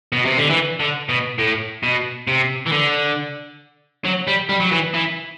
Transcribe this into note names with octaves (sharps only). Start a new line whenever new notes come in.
B2
C3
D3
E3
D3
B2
A2
B2
C3
E3
D3
F#3
G3
G3
F#3
E3
E3